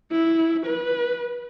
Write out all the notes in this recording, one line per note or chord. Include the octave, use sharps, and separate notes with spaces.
E4
B4